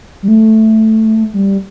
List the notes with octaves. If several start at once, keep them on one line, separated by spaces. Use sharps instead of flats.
G3
A3
G3